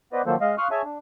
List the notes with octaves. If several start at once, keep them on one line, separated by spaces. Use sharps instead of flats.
B3 B4 C5 D5 D#5
D#3 F3 F#3 A#3 A4 C5
G#3 D#5 F5
F5 C6 C#6 D#6 F6 F#6
G#4 C#5 E5 G#5 A5
D4